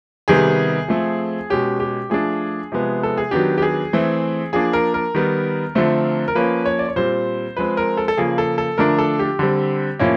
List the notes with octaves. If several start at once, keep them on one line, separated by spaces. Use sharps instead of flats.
C3 D#3 G3 B3 G#4
F3 A3 C4
B2 G#3 C#4 G4
G4
F3 A3 D4 G#4
C3 F3 G#3 B3
A4
G#4
D#3 F#3 B3 D4 G4
G4
G#4
E3 A3 C4
F3 A#3 D4 G#4
A#4
A#4
D#3 G3 B3
D3 F3 A3 C4
A#4
F3 A#3 C#4 B4
C#5
D5
C#5
A#2 G3 C4 C5
F3 G#3 C4 B4
A#4
A4
A4
C#3 F3 A#3 G#4
A4
A4
D3 F3 A3 D4 A#4
A4
G4
D3 G3 C4
A2 F3 A#3 C#4